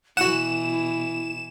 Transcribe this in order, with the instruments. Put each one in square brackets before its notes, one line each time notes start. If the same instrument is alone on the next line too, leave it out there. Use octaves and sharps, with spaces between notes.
[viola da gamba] B2 E3 [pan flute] E4 [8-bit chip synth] F#4 F#5 [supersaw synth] E7